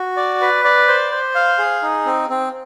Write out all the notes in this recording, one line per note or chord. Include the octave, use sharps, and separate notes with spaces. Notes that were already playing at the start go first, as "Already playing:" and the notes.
Already playing: F#4
D5
B4
D5
C5
C5
F5
G#4
D#4
C4
C4